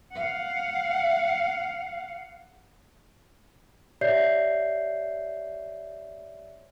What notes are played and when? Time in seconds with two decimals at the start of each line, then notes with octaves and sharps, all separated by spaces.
0.11 F5 F#5
4.01 G4 C#5 D5 E5 G6 C7